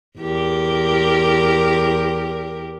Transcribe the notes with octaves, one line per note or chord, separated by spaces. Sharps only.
E2 G4 A#4